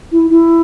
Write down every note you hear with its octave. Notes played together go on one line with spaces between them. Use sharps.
E4
E4